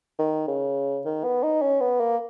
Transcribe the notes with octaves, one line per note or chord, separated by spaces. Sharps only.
D#3
C#3
D#3
B3
D#4
C#4
B3
A#3